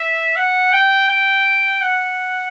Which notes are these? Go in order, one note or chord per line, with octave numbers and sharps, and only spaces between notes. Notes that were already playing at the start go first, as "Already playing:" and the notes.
Already playing: E5
F#5
G5
G5
F#5